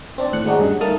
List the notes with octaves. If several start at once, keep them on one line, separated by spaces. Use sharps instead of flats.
C4 D4 D5
D#2 A2 F#6 C#7
F#3 G#3 D4 D#4 F#4
G2 C#3
D#3 A3 A#3 A5 D#6 F6